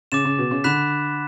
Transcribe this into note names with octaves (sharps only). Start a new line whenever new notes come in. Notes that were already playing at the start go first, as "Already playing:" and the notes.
C#3 D6 A6 E7
C#3
B2
C#3
D3 B5 F#6 B6 E7